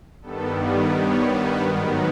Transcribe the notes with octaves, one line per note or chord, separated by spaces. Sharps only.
G2 D#3 G3 B3 A4
D5
C#5
B4
G#2 D#3 F#3 B3 A#4